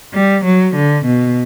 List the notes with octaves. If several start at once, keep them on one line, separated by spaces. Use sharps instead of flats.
G3
F#3
D3
B2